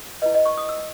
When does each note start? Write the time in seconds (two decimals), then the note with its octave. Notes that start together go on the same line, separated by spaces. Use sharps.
0.22 E4 B4 D#5
0.34 D#5
0.45 C#6
0.58 D#6
0.69 E6